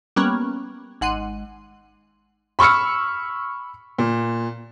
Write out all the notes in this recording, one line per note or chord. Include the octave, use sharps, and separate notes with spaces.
G3 A#3 B3 C#4
G#1 F#5 C6 D#7
B5 C#6 E6 F6 C#7
A#2